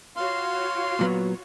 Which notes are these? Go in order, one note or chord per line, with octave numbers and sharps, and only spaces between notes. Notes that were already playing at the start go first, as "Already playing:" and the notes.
F4 F#4 C#5 F5 C6
A#2 F#3 B3